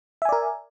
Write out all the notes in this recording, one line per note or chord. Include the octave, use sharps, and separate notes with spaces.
A#4 D5 E5 G#5